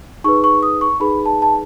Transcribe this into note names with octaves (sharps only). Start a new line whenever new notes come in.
D#4 G#4 B4 C#6
C#6
D#6
C#6
D#4 G#4 B4 B5
A5
A5